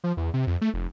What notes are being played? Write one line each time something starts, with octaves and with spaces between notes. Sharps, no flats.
F3
E2
C3
F2
A3
F1